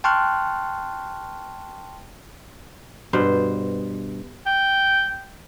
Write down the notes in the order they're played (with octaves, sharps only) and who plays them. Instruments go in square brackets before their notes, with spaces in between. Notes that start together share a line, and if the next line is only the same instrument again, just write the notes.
[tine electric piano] G5 A5 C6 C#6 F6 F#6
[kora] G2 B2 C5
[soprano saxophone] G5